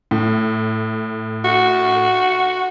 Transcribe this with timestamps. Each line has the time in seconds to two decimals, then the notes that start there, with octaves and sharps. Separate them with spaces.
0.11 A2
1.44 F#4